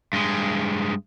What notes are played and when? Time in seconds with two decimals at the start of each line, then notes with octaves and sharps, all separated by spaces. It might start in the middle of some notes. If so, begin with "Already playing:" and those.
0.13 G2 G#3